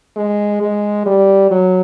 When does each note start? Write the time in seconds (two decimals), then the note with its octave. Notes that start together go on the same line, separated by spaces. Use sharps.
0.16 G#3
0.61 G#3
1.06 G3
1.51 F#3